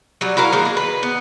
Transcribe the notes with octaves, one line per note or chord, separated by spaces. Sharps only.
F#3 G3
E4 F#4 A#4 F5
D#3 G#3 A#3
G#4
B4
B3